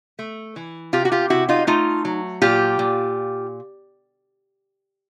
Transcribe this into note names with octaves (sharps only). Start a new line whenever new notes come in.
A3
E3
C3 F4 G4
F#4
F4 G4
C3 E4 F#4
D#4 F4
A3 D#4 F4
F#3
A#2 F4 G4
A#2